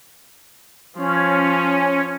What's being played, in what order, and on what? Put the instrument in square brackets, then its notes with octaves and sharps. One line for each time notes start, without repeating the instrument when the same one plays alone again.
[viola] F3 [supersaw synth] C#4